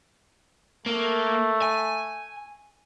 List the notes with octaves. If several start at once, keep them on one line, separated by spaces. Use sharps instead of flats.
A3 A#3
G#5